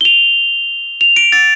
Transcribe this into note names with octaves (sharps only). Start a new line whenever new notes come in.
G7
F7
F7
D7
A6